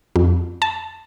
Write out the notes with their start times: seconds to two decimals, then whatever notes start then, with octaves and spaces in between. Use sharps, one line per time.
0.16 F2
0.62 A5